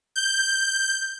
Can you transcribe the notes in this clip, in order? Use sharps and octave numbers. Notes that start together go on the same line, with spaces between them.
G6